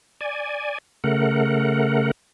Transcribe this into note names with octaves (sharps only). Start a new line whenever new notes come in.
D5 G#5
C#3 A3 A#4 F#5